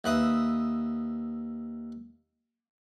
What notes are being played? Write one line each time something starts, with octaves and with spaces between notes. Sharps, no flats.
D#2 B4 E5 D#6